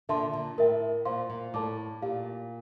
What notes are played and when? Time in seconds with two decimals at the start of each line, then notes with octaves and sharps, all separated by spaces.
0.09 A#2 D3 A4 E5 A5 C6
0.34 A#2
0.58 A2 A#4 E5 G5
1.05 A#2 C5 F5 C6
1.30 A#2
1.54 A2 A4 D5 A5 D6
2.02 A#2 E4 G4 D5 F5